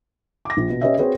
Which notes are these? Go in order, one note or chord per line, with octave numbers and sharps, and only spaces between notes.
D6 A#6
A#1
B2
C#4 G4 B4 C#5 D#5 E5
C4 F#4 G#4 B4 C#5